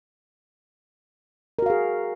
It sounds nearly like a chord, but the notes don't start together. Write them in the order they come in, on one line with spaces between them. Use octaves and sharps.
A#4 F#4 F5 G#4